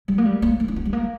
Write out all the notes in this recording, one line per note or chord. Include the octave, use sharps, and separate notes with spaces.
G3
A#3
G3
A#3
A#3
C#4
B3
G3
A#3